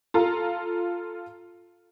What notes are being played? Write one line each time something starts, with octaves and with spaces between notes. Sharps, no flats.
F4 A4 A#5